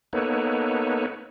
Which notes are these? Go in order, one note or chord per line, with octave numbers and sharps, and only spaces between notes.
A#3 B3 D#4 A4 B4 C#5